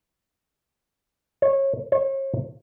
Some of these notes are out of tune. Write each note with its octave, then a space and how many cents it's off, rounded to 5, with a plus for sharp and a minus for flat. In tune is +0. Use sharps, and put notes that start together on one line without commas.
C#5 -25
C#5 -40